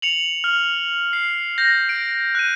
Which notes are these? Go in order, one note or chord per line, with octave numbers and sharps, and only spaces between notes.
C#7 F7 F#7
F6
C7
G6 A#6
D7
F#6 D#7